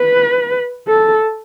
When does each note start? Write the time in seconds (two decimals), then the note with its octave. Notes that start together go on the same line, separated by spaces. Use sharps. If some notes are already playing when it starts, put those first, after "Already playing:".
Already playing: B4
0.88 A4